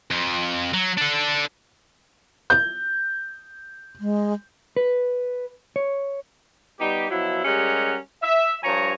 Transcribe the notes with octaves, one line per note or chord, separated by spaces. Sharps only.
F2
F#3
D4 A4
G6
G#3
B4
C#5
G3 B3 D#4 G4
B2 F3 F#3 E4
G3 G#3 C#4 G4 A#4 F#5
E5
G2 F3 C#5 G#5 A#5